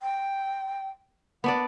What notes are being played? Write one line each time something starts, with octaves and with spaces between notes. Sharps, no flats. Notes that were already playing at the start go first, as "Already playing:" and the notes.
G5
B3 D4 D5 F#5